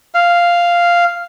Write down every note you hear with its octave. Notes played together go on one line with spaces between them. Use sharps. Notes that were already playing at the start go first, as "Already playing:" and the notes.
F5